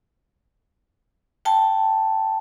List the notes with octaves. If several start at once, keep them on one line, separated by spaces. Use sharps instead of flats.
G5 A5